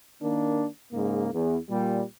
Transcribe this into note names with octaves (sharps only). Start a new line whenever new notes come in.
D#3 A#3 D4
G#2 C#3 A#3
E2
A#2 G3